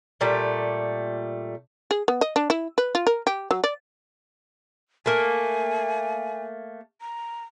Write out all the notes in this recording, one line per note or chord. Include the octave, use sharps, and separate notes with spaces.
A#2 G3 A3
G#4
B3
D#5
D4
E4
B4
F4
A#4
G4
F#3
D5
A3 A#3 G#5
A#5